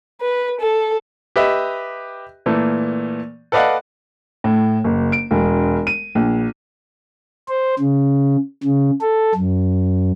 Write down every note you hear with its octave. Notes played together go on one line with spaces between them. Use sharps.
B4
A4
G4 B4 D#5 E5
A#2 E3 A3 A#3
A4 B4 D5 D#5 F5 F#5
A2
F#1
D7
E1
D#7
A#1
C5
C#3
C#3
A4
F#2